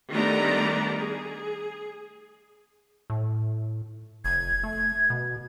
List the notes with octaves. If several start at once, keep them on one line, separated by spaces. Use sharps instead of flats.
D#3 G3 A3 B3 D4 A#5
G#4
A2
F1 G#6
A3
B2